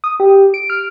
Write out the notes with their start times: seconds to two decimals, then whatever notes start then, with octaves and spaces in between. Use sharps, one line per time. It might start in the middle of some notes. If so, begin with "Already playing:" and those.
0.04 D#6
0.20 G4
0.54 D7
0.70 F6